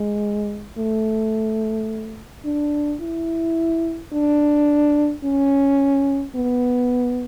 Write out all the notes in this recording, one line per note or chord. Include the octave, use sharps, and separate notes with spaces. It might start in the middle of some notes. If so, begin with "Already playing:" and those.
Already playing: G#3
A3
D4
E4
D4
C#4
B3